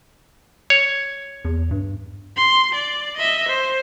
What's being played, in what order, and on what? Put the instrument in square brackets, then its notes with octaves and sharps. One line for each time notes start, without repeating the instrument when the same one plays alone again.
[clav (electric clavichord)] C#5
[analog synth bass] E2
G2
[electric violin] C6
D5
D#5 E5
C5